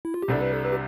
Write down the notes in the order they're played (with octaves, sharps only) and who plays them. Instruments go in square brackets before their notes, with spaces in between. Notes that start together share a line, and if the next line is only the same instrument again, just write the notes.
[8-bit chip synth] E4
F4
G4
[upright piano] C2 C3 G3 D4 [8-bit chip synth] A4
[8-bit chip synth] B4
A4
B4
G4